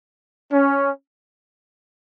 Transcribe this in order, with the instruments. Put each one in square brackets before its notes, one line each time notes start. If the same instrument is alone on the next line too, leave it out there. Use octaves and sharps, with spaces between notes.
[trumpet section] C#4